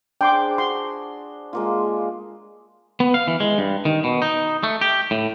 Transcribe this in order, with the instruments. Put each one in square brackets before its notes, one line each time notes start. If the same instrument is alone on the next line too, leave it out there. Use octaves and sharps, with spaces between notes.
[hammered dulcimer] D4 G#4 C5 [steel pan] G5 C6 D6
[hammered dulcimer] F#4 [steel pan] C6
[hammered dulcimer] G#3 A#3 F4
[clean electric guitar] B3
F5
E3
G#3
G2
D#3
B2
D#4
A3
G4
A2